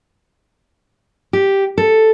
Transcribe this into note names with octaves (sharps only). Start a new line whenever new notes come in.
G4
A4